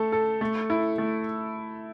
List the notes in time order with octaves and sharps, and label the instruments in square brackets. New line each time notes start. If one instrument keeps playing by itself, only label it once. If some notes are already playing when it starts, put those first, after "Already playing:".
Already playing: [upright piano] A3 A4
A4
A3
E4
A3